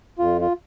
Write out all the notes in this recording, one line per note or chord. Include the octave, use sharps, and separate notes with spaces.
F2 F4
F4